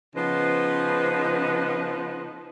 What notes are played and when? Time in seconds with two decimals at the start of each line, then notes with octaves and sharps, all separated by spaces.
0.16 C#3 F3 B3 D#4 B4 C5